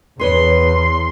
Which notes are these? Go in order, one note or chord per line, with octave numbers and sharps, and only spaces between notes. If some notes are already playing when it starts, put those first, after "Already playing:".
E2 G#4 B4 C#5 C6